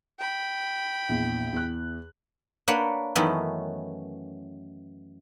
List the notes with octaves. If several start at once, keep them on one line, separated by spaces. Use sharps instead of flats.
G5 B5
A#1 E2
E2 F#6
A#3 D4 B4 C#5 F#5 G5
F#2 D#3 E3 A3 B3 C#4